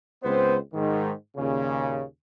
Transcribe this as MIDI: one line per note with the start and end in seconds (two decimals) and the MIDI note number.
0.24 0.56 37
0.24 0.56 59
0.24 0.56 60
0.24 0.56 71
0.24 0.56 72
0.74 1.13 44
0.74 1.13 51
1.37 2.03 39
1.37 2.03 46
1.37 2.03 49